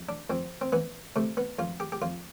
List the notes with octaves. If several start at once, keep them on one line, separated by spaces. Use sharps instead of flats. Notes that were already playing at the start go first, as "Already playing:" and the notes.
Already playing: F2
D4
F2 C4
C4
E3 B3
C3 A3
B3
F2 F4
G4
G4
F2 F4